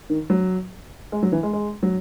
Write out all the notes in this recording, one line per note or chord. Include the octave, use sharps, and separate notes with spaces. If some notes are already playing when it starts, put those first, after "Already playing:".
D#3
F#3
G#3
F#3
E3
G#3
G#3
F#3